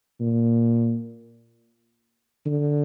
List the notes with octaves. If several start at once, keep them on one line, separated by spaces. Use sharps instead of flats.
A#2
D3